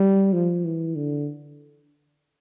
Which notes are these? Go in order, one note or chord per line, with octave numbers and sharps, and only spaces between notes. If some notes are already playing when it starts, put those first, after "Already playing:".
Already playing: G3
F3
E3
D3